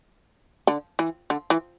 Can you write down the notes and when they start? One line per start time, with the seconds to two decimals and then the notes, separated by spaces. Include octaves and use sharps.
0.67 D3
0.99 E3
1.30 D3
1.50 E3